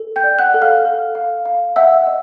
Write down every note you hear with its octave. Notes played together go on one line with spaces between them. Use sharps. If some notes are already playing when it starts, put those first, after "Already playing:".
Already playing: A4
G5 G6
D5
F#5 F#6
A4
F5 F6
A4
F5
F5
E5 F#5 E6
D#5